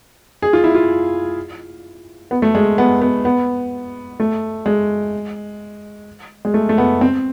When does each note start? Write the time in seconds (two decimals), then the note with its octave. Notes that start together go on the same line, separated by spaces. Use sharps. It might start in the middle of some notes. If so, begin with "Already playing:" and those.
0.42 G#4
0.53 F4
0.64 E4
0.75 F4
2.31 B3
2.42 A3
2.55 G#3
2.78 B3
3.02 B3
3.25 B3
4.20 A3
4.66 G#3
6.45 G#3
6.54 A3
6.69 A3
6.78 B3
7.01 C4